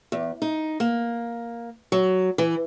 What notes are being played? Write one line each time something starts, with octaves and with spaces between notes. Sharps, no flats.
E2
D#4
A#3
F#3
E3